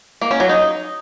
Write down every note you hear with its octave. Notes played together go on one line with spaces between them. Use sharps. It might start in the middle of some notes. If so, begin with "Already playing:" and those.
A#3
C#4
F#3
D#4